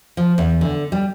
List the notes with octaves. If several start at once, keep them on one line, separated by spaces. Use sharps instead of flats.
F3
E2
D3
G3